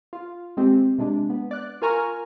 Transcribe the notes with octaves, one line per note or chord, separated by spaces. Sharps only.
F4
G#3 C4 G4
C3 G#3 D4
B3
D5 F#6
F4 A#4 G#5 A#5 C#6 F6